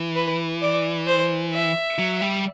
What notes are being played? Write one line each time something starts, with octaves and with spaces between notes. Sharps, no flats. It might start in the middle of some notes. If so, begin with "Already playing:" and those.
Already playing: E3
B4
D5
C5
E5
F#3
G3